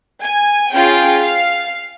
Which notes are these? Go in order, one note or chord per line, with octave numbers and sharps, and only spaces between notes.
G#5
C#4 F4 G#4 G5
F5